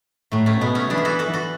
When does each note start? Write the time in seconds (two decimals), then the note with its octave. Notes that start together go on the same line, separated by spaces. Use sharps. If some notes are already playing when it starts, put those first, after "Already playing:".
0.32 A2 F#3 A3
0.46 A3 C#4
0.61 B2 G#3 B3
0.75 A3 C#4
0.90 E3 B3 D4
0.98 G#4
1.05 F#4 A4
1.19 F#4 A4
1.34 F#4 A4